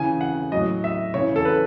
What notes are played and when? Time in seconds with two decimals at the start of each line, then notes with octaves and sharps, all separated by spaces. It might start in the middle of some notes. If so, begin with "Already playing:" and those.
Already playing: C#3 E3 G#5
0.21 F#5
0.52 A2 F#3 D#5
0.84 E5
1.14 C#3 E3 C#5
1.36 A4
1.45 B4